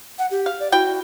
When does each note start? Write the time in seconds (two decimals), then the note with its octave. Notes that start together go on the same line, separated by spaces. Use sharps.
0.18 F#5
0.31 G4
0.46 F5
0.60 D5
0.72 E4 F#4 G5